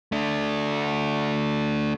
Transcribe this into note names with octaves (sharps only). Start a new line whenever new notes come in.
A3 D4